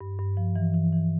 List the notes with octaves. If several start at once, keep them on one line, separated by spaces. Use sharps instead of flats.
G2
G2
F3
E3
E3
E3